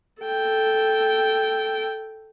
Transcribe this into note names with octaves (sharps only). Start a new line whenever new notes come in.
A4 G5